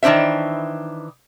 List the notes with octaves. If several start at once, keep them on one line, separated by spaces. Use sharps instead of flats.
D#3 E3 D4 C5 E5